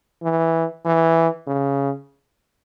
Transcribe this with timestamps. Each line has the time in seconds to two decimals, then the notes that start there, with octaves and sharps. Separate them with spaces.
0.23 E3
0.85 E3
1.47 C#3